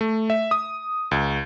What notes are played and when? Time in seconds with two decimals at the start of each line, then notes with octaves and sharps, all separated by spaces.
0.01 A3
0.30 E5
0.51 D#6
1.11 C#2